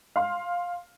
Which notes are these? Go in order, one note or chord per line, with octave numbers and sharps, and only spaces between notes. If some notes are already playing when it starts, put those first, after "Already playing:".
F5 C6 F6